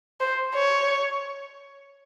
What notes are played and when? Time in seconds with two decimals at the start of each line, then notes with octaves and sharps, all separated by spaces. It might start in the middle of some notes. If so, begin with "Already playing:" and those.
0.21 C5
0.55 C#5